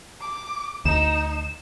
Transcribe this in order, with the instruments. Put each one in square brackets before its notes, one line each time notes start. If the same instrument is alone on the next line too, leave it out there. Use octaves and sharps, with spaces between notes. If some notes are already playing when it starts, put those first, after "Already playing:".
[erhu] D6
[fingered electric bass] D2 [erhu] D#4 [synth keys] E7